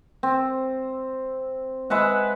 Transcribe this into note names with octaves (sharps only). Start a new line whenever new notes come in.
C4
G#3 B4 E5 F#5